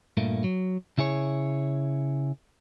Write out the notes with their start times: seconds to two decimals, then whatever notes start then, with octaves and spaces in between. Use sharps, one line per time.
0.17 G2 A#2 A3 A#3
0.44 F#3
0.98 C#3 E4 G#4 C#5